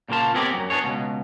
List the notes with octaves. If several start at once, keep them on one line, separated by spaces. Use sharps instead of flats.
A#2 C#3 A#3 F4 A5
B3 C4 G4 G#4 A#4 D5
F#2 F#3
B3 D4 G#4 C#5
C#2 B2